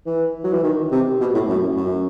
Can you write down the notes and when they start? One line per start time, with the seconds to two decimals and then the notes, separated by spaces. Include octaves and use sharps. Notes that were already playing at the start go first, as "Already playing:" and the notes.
0.06 E3
0.44 F#3
0.53 E3
0.63 D#3
0.92 C3
1.20 B2
1.34 A2
1.48 F#2
1.77 F#2